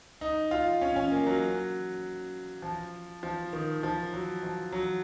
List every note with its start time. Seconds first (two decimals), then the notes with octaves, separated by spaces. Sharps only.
0.21 D#4
0.51 F4
0.81 C#4
0.96 C#4
1.12 A#3
1.27 F#3
2.62 F3
3.23 F3
3.53 D#3
3.83 F3
4.13 F#3
4.43 F3
4.72 F#3